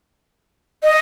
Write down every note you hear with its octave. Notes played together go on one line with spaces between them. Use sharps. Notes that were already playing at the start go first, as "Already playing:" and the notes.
D#5